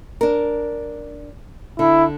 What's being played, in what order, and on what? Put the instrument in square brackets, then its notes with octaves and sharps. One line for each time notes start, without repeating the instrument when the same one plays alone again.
[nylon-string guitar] D4 A#4
[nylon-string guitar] D3 [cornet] E4